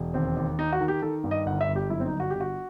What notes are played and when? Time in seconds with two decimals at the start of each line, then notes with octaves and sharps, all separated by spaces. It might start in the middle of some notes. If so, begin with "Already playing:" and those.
Already playing: E1
0.14 D#2 C4
0.37 D#2
0.58 D#3 D#4
0.72 F#4
0.81 D#3
0.88 G4
1.02 D#3 A4
1.24 G2
1.31 D#5
1.46 G1 F#5
1.61 E5
1.68 G1
1.76 G4
1.90 F#2 E4
2.00 C4
2.06 D#4
2.13 G1
2.20 F#4
2.30 G1 G4
2.40 F#4